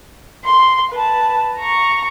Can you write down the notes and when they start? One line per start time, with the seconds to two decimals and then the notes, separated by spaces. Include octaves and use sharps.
0.44 C6
0.91 B4 A5
1.57 A#5 C#6